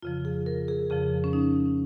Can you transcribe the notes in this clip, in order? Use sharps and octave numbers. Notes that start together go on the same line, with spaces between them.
F2 C#3 F3 F4
G#4
A#4
G#4
F2 C#3 F3 G#4
C#4
D#4